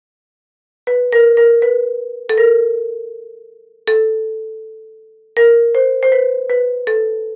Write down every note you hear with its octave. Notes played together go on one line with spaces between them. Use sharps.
B4
A#4
A#4
B4
A4
A#4
A4
A#4
C5
C5
B4
B4
A4